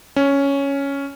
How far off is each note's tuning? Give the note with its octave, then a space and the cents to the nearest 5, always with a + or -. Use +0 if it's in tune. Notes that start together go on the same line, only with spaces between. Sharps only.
C#4 +5